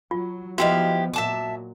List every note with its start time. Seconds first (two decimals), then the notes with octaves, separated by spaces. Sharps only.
0.11 F#3 F4
0.58 F3 B3 E4 F#4 G4 D#5 F5
1.14 A#2 F#3 E5 A5 D6